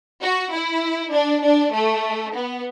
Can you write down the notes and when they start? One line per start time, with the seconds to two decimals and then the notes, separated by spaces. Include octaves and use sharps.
0.22 F#4
0.53 E4
1.13 D4
1.44 D4
1.73 A3
2.34 B3